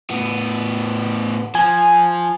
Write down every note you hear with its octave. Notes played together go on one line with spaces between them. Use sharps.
A2 B3
F3 G#5